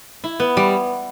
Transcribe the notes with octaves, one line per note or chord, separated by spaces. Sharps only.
E4
B3
G3